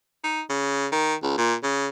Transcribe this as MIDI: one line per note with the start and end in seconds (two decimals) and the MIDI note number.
0.24 0.41 63
0.50 0.86 49
0.92 1.14 51
1.23 1.36 37
1.38 1.54 46
1.63 1.88 49